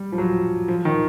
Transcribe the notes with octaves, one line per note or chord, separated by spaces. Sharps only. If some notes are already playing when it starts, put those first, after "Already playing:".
Already playing: G3
F3
F#3
F3
D#3